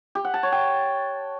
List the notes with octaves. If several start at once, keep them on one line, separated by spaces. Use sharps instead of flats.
G4
F#5
A5
C#5
G5